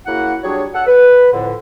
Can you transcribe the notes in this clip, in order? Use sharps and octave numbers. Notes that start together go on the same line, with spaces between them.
C#3 A#3 E4 F#4 F#5
F#3 G3 D4 G#4 C#5
A4 F#5
B4
F2 A2 D3